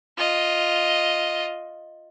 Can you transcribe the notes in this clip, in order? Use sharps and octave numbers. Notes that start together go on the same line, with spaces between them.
F4 D#5